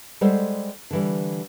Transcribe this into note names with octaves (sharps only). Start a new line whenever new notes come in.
G3 G#3 A4 C5 F#5
D3 E3 G3